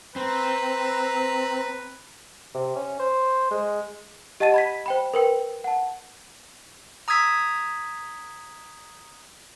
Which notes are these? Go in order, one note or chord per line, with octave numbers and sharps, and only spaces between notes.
C4 B4 A#5
C3
C#4
C5
G#3
G4 D#5 F#5 A5 A6 D#7
B5 G#6 B6
C5 G5 B5
A#4 B4 G5
F#5 A5
A#5 D#6 E6 G#6 B6